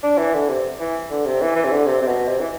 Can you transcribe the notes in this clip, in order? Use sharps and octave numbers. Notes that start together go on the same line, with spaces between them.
D4
E3
D3
C3
E3
D3
C3
E3
E3
C3
D3
C3
C3
B2
C3
E3